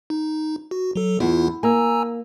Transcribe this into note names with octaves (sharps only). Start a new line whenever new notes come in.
D#4
F#4
F#3 A4
E2 B3 E4 F4
A#3 G#5 A#5 E6